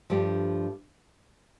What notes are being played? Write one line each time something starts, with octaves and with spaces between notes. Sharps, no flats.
G2 F3 A3 D4 G4